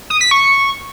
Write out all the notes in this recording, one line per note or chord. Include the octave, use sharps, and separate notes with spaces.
D#6
B6
C#6